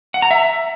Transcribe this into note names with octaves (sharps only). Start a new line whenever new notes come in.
F#5
A#5
E5